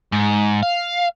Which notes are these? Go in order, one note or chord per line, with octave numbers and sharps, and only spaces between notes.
G#2
F5